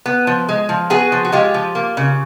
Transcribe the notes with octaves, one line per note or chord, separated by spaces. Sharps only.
B3
F3
G#3
F3
B3 F#4 G#4
F3
F#4
G#3 F4 G4
F3
A#3
C#3